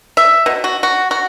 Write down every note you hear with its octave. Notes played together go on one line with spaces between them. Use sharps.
E5
B2
F#4
F#4
F#4